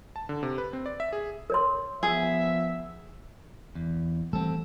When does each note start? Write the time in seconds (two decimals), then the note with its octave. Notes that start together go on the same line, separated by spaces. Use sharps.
0.16 A5
0.29 D3
0.43 C3
0.58 B4
0.73 C4
0.86 D5
1.00 E5
1.13 G#4
1.50 A#4 C#5 C6
2.03 F3 B3 G#4 E5
3.75 E2
4.33 E3 G3 A3 C4 A4